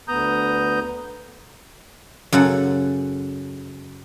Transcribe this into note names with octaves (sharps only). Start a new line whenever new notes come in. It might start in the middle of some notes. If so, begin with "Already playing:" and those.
D2 B3 A#5 D#6 G6
F#2 C#3 A4 F#5